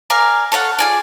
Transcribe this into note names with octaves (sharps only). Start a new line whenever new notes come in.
A#4 D5 F5 G#5
A4 C#5 F5 F#5
F4 G#4 D5